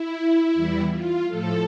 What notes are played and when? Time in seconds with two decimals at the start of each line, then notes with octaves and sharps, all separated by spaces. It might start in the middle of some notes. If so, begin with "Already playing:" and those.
Already playing: E4
0.54 E2 E3 G3
0.91 F4
1.27 A2 F3 A4